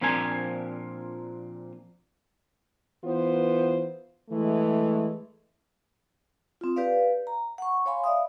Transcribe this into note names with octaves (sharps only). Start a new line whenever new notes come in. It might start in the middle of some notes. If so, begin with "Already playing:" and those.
A#2 F3 C4 D4 A#4 G#5
E3 B3 F4 C5
E3 G#3 A3
C4 F4
G4 B4 D5 F5
A#5
F#5 C#6
C#5 F5 G#5 B5 C6
D5 E5 F5 D#6